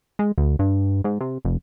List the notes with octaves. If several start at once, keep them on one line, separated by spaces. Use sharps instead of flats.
G#3
D2
G2
G#2
C3
F1